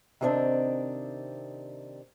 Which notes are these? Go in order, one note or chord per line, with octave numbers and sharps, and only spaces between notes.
C3 D#3 G3 C4 D4 D#5